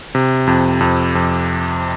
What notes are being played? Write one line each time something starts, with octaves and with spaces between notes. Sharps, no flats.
C3
F2
F2
F2